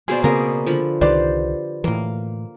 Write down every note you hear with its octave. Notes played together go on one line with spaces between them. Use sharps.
B2 A#3 G#4 C5 D5
C#3 A#3 C4 G#4 A#4 D5
D3 F3 B5
C2 D#3 G4 B4 C5 D5
A2 E3 A#3